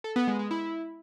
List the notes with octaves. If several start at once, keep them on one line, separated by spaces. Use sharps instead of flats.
A4
B3
G#3
G#3
E4